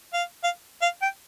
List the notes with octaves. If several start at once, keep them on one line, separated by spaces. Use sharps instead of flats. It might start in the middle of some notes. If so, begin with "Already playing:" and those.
F5
F5
F5
G5